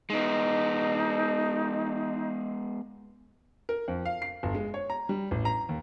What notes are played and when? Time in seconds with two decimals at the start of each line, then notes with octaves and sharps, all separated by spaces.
0.10 G#3 B3 D#4
3.69 A#4
3.88 F2
4.05 F5
4.22 C7
4.43 G1
4.55 G#3
4.74 C#5
4.90 A#5
5.09 G3
5.31 A1
5.45 A#5
5.69 D#2